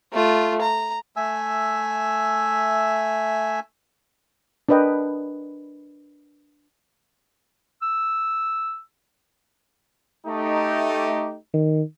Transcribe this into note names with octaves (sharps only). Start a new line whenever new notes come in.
A3 F4
A#5
A3 E5 G#5 E6
D4 A#4 B4 D#5 G5
E6
A3 D#4 G4
D#3